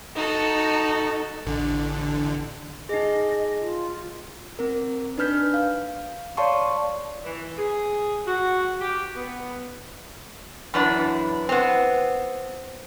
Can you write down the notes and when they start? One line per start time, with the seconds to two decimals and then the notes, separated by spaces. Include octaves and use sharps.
0.16 D#4 F#4 A4
1.45 A1 D3
2.89 D#4 G#4 D#5
3.60 F4
4.59 C4 A#4
5.18 D4 D#4 B4 F6 G6 B6
5.54 F5
6.37 C#5 D5 F5 A5 C6 C#6
7.24 E3
7.58 G#4
8.27 F#4
8.81 G4
9.15 B3
10.74 F#2 E3 D4 E4
11.49 B3 C4